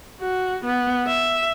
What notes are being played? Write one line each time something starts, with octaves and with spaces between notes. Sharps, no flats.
F#4
B3
E5